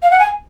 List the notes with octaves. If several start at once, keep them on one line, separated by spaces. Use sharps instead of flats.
F5
F#5
G#5